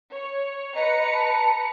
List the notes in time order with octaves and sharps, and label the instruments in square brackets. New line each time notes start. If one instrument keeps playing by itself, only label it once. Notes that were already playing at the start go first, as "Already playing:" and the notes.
[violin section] C#5
[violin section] B4 A#5 C#7 [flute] D#5
[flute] A5